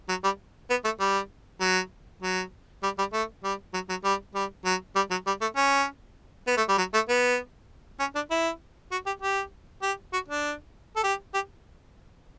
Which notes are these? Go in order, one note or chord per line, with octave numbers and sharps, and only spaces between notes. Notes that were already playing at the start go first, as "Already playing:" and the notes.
F#3
G3
B3
A3
G3
F#3
F#3
G3
G3
A3
G3
F#3
F#3
G3
G3
F#3
G3
F#3
G3
A3
C#4
B3
A3
G3
F#3
A3
B3
C#4
D4
E4
F#4
G4
G4
G4
F#4
D4
A4
G4
G4